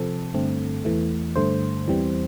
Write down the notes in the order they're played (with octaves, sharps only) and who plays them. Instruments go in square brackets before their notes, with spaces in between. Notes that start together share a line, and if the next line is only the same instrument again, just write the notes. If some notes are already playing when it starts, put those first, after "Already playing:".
Already playing: [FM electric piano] C3 F3 C4 A4
G2 D3 A3 C4
E2 E3 A3
G2 D3 A3 C5
E2 E3 G3 C4